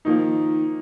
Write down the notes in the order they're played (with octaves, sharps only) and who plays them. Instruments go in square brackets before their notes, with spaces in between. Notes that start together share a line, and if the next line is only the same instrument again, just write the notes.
[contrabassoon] D#3 [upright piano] F3 A#3 D#4